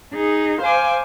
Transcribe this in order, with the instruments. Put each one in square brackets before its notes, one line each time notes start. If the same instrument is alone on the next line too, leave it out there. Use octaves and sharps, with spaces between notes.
[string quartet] D#4 G#4
C5 F5 G#5 D6